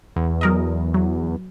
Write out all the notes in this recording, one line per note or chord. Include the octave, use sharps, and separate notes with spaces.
E2
F#3 A#4 D#5
F#3